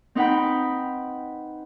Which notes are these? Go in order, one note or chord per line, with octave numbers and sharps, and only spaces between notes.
C4 D#4 B4 F#5 G5 B5